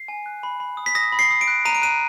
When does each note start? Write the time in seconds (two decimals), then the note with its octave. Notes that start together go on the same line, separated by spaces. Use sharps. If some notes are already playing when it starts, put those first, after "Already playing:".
Already playing: C7
0.08 G#5
0.26 F#6
0.43 B5
0.60 B5
0.77 D#6
0.86 B6
0.95 D#6 A#6
1.12 B5
1.19 C7
1.31 D#6
1.41 D7
1.48 F#6
1.65 A#5 D#7
1.75 D7
1.82 F#6 D#7